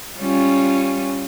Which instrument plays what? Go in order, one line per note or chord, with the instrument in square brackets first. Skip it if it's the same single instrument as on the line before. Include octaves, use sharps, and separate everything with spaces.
[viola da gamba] G3 C#4 F4